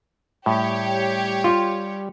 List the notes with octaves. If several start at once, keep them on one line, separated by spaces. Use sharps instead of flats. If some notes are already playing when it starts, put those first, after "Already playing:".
A2 G3 G4 C#5
F4